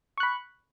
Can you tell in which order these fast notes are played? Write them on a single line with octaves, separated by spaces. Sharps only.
C#6 F#6 B5